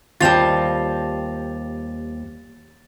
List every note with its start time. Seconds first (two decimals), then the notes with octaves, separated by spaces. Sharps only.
0.21 D#2 G3 C4 F4 A5 A6 F7